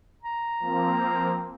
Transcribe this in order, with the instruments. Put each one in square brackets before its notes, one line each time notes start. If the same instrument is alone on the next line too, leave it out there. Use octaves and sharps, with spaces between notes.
[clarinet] A#5
[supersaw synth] F3 A#3 C4